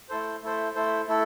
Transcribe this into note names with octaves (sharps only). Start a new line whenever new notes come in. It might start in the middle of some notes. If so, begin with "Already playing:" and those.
A3 E4 A4 C5
A3 E4 A4 C5
A3 E4 A4 C5
A3 E4 A4